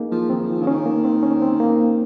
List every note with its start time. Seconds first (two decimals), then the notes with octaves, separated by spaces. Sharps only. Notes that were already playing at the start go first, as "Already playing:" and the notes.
Already playing: A#3 D#4 G#4 A#4
0.11 F3
0.30 D#3 C4
0.49 F3
0.62 C#3
0.67 D#3 C#4
0.86 A#3
1.04 C4
1.23 C#4
1.42 C4
1.60 A#3